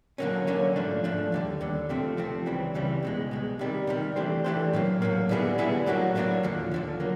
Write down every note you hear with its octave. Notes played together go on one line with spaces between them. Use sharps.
D3 F#3 A#3 C#4
D3 F#3 A#3 C#4
G#2 F3 A3 D4
G#2 F3 A3 D4
D#2 D3 G3
D#2 D3 G3
C3 F3 A3 C4
C3 F3 A3 C4
C#2 C#3 E3 G3 C4
C#2 C#3 E3 G3 C4
C2 B2 G#3
C2 B2 G#3
C3 D#3 G3
C3 D#3 G3
E3 A3 D4 G4 C5
E3 A3 D4 G4 C5
A2 F#3 A#3
A2 F#3 A#3
D3 G3 B3 E4 G#4
D3 G3 B3 E4 G#4
A2 F#3 A#3 D4 F#4
A2 F#3 A#3 D4 F#4
D#2 D3 F3
D#2 D3 F3
F#3 A#3